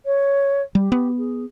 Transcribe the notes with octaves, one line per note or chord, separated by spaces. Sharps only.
C#5
G3 G4
B3
G#4